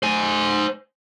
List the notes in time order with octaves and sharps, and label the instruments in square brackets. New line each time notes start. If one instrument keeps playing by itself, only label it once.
[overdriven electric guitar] C5 G#5